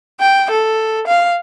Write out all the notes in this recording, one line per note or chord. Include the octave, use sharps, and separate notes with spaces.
G5
A4
F5